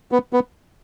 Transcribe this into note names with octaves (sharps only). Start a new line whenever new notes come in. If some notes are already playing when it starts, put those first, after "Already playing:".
B3
B3